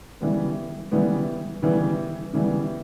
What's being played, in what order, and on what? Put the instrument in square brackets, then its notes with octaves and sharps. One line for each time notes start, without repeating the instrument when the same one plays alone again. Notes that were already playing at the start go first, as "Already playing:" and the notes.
[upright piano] C#3 E3 G3 B3
C#3 E3 G3 B3
C#3 E3 G3 B3
C#3 E3 G3 B3